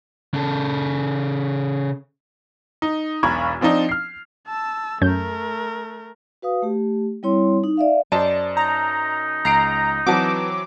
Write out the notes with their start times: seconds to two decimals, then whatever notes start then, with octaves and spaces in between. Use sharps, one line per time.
0.34 C#3 A4
2.82 D#4
3.23 E1 B1 A#5 B5 C#6 G#6
3.61 F3 C4 D4 D#4
3.89 F6 C7
4.47 A5 E6
5.01 F#2 A3 C#4 A#4 G6
6.42 F#4 B4 F5 D#6
6.62 A3 G4
7.23 G3 C4 E4 C#5 C6
7.64 D#4
7.77 D5 E5 F5
8.12 F#2 C5 D5 D#5 A5
8.57 D#4 A#5
9.45 C#2 A#5 C7 D7
10.06 E3 F#3 C4 F#4 B4 A5 D6